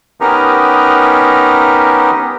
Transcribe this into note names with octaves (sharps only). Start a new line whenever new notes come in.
B3 C#4 D#4 G4 A#4